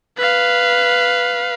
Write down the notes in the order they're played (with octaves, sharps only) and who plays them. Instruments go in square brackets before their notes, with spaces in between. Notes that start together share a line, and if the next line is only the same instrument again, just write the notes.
[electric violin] B4 F5